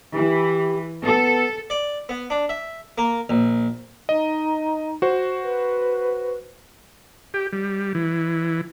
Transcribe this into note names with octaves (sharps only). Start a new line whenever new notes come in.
E3 G4
B3 A4
D5
B3
D4
E5
A#3
A#1
D#4 D#5
F#4 C5
B4
G4
G3
E3